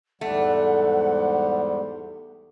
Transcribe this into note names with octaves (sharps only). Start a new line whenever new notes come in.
E2 G#2 G3 A3 F#5